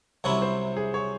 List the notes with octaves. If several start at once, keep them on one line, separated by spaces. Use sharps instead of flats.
C2 C3 F#3 C#4 E4 C#5
C5
G#4
C#5